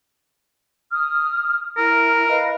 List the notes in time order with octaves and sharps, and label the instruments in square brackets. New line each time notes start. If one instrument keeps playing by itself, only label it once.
[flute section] D#6 F6
[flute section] E4 F6 [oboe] A#4
[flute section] B4 D#5 F5